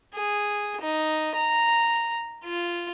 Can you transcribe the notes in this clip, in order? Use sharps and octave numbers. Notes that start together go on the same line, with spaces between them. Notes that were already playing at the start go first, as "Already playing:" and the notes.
G#4
D#4
A#5
F4